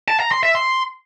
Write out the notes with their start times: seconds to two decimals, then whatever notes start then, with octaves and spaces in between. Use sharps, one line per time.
0.08 A5
0.20 A#5
0.31 C6
0.43 E5
0.55 C6